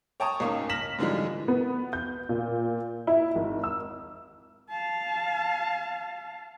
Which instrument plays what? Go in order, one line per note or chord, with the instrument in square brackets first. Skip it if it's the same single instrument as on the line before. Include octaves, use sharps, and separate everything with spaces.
[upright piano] C#5 G5 A5 A#5 C#6 D#6
C#2 G#2 A#3 C#4
F6 A#6 B6 E7 F#7
G#2 D3 E3 F3 G3 G#3
[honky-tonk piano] B3
G6
A#2
E4
G#1
E6
[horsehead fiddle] F5 A5